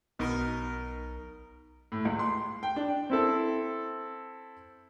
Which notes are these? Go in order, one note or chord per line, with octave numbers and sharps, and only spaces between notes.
B1 B2 D#4 A#4
A2
C#2
C6
G5
D4
C4 E4 A4